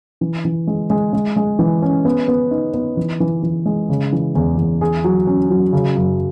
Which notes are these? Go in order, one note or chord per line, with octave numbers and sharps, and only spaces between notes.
E3
E3
G#3
G#3
G#3
G#3
E3
C#4
B3
B3
D#4
B3
E3
E3
E3
G#3
C#3
E3
E2
E2
G#4
F#3
C#4
F#3
C#3
F#2